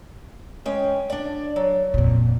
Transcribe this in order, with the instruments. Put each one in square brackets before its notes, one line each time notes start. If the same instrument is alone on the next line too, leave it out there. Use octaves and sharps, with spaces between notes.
[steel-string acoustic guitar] G#3 C#4 G5
D4 D5
F#3
[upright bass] F2 A#2